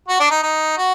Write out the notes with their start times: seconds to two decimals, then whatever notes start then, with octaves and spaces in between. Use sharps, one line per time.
0.08 F#4
0.20 D4
0.31 D#4
0.43 D#4
0.78 F#4